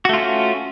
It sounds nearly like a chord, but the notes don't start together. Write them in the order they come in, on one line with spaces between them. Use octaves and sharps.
F#4 A3 F4 C#4